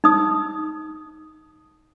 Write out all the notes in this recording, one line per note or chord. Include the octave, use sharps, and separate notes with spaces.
D#4 D#6